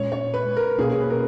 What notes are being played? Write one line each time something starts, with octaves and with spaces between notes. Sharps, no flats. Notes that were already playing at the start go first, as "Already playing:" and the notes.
Already playing: A#2 G#3 C#4 C#5
C#5
B4
A#4
B2 A#3 C#4 G#4
G#4
B4
A#4